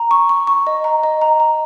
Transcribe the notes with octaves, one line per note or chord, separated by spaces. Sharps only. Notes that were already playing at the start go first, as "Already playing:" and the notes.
Already playing: A#5
C#6
C#6
C#6
D#5
A#5
D#5
A#5
A#5